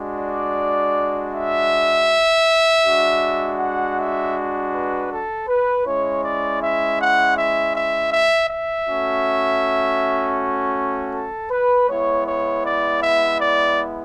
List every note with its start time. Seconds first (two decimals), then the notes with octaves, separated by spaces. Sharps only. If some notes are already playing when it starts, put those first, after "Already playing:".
Already playing: G#3 D4 F#4
0.20 D5
1.33 E5
2.84 G#3 D4 F#4
3.59 F#5
3.98 E5
4.73 B4
5.10 A4
5.48 B4
5.86 G#3 C#4 E4 C#5
6.23 D5
6.62 E5
6.99 F#5
7.36 E5
7.75 E5
8.12 E5
8.49 E5
8.87 A3 C#4 F#4
11.14 A4
11.51 B4
11.89 G#3 B3 E4 C#5
12.27 C#5
12.65 D5
13.02 E5
13.40 D5